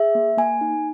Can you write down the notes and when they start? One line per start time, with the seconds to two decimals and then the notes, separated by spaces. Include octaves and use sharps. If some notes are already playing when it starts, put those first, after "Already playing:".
Already playing: G#4 E5
0.15 A#3
0.37 A#3 G#5
0.61 D#4